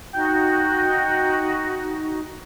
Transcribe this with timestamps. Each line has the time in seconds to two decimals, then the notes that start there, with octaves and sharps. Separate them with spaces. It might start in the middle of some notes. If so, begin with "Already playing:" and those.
0.14 D#4 F#4 G5